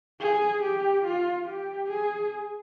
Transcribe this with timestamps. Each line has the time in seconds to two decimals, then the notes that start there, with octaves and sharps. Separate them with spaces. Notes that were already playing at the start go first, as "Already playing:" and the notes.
0.20 G#4
0.63 G4
1.06 F4
1.48 G4
1.91 G#4